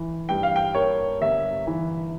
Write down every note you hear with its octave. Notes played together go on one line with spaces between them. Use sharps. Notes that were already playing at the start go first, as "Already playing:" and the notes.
Already playing: E3
G2 G5
F5
G5
A#3 C#5
G1 E5
E3